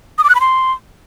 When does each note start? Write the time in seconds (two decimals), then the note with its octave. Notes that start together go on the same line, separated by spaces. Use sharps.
0.18 D#6
0.24 D6
0.29 F#6
0.35 B5
0.40 C6